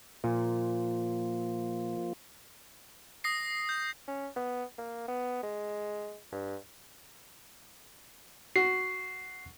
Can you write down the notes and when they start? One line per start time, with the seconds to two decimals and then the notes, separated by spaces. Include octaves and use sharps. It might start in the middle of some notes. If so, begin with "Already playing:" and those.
0.24 A#2 F3 A#3 F4
3.24 D#6 A#6 C7
3.69 G6
4.08 C#4
4.36 B3
4.78 A#3
5.08 B3
5.43 G#3
6.32 G2
8.56 F#4 C7